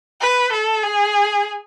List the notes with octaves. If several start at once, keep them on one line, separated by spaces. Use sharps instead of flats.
B4
A4
G#4